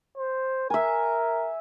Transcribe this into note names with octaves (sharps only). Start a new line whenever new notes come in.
C5
A#4 E5 G#5